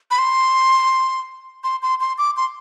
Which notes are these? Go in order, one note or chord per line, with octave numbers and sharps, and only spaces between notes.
B5
C6
C6
C6
C6
D6
C6